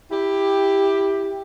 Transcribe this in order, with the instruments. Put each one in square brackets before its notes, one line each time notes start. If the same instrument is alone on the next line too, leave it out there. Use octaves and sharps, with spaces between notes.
[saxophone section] E4 G4